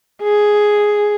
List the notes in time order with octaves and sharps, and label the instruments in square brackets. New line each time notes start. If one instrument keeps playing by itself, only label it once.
[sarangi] G#4